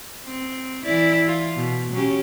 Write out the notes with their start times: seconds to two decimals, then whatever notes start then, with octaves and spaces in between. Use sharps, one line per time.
0.24 C4
0.83 E3 E4 D5
1.27 F4
1.57 B2
1.93 F#3 C#4 G4